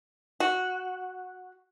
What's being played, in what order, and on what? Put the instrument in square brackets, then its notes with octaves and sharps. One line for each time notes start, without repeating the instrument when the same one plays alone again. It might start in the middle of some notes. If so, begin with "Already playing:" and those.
[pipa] F#4